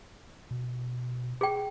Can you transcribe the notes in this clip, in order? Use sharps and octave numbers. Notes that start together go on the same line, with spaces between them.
B2
G#4 G5